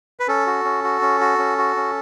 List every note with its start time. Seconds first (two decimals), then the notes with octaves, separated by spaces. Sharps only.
0.20 B4
0.28 C#4 A4
0.46 F#4
0.65 C#4
0.84 F#4
1.02 C#4
1.21 F#4
1.38 C#4
1.58 F#4
1.76 C#4